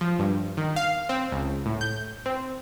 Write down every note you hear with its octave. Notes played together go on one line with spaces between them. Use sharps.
F3
G2
D#3
F5
C4
C#2
A2
G6
C4